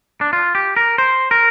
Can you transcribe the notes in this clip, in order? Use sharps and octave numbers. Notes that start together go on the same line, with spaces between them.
D4
F4
G4
A#4
C5
A#4